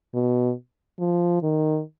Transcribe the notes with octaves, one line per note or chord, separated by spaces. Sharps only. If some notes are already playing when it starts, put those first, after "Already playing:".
B2
F3
D#3